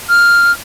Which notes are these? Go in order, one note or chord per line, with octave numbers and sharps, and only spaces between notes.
F6